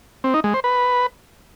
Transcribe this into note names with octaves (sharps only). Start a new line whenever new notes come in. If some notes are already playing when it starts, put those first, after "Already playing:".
C4
D#4
G#3
C5
B4